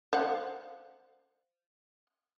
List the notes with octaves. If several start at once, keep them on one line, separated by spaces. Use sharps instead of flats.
C5 F5 F#5